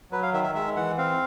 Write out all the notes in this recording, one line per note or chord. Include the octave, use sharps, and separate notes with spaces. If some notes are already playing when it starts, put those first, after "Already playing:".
F#3 B4
F5
D#3 E5
E5
G#3 E5
E3 F#5
C4 F5